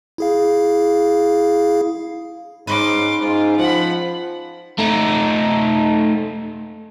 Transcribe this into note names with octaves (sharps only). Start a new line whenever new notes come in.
E4 G#4 F5
G#2 C#4 D#4 B4 C6 D6
G#2 F4
F3 F#5 B5
A3 D#4